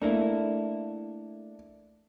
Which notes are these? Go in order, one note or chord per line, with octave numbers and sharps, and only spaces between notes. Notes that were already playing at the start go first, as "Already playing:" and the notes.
A3 A#3 D4 E4